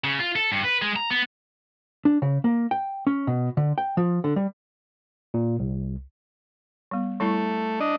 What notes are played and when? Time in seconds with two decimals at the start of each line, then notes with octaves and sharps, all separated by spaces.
0.04 C#3
0.20 F4
0.36 A4
0.52 G2
0.64 B4
0.82 G#3
0.96 A#5
1.10 B3
2.05 D4
2.22 C#3
2.44 A#3
2.71 G5
3.07 C#4
3.27 B2
3.57 D3
3.78 G5
3.97 F3
4.24 D3
4.36 G3
5.34 A#2
5.59 C2
6.91 G3 B3
7.20 G3 A3 E4 C#6
7.80 D4 D#5